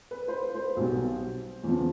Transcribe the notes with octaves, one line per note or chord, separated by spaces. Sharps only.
B4
C5
B4
C5
B1 B2 G3
E2 C#3 F3